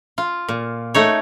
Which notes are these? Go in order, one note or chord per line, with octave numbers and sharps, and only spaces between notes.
F4
A#2
A3 D#4 C#5